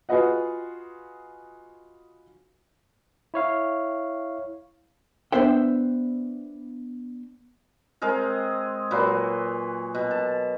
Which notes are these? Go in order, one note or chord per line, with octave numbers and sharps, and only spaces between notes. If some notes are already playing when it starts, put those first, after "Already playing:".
F4 F#4 G#4 B4 D#5 F#5
E4 C#5 F5
B3 D4 C5 E5 G5
G#3 C4 G#4 A#4
A#2 F#3 B4 C6
B2
A5